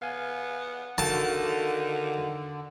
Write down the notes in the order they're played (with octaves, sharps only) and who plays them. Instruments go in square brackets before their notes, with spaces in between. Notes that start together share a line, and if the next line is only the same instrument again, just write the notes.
[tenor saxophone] B3 [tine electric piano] F5 G#5
[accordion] D3 [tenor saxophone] D#3 [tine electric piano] F#4 A4 F5 [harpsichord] A5